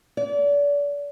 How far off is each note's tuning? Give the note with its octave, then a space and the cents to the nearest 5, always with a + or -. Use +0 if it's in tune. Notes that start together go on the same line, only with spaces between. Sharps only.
D5 -35